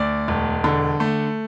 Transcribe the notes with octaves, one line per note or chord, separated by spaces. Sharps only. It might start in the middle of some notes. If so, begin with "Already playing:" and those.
Already playing: D2 D5
E1
D3
A3